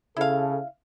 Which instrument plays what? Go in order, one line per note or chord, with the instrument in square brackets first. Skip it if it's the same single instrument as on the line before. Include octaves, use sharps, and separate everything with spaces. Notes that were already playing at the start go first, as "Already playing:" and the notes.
[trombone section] C#3 A4 [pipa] E4 F5